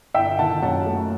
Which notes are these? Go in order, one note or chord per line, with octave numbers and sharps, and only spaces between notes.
G1 E5 G5
D#3 F#5 A5
F#2 F#5 A5
A3